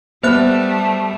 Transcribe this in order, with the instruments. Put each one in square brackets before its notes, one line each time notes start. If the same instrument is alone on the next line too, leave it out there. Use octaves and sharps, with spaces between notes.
[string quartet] G3 A3 [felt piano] B3 [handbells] C5 E5 F#6